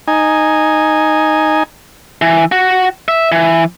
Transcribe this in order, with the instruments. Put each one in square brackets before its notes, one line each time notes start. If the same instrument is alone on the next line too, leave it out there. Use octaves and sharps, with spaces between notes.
[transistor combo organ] D#4 G#5
[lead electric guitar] E3
F#4
E5
E3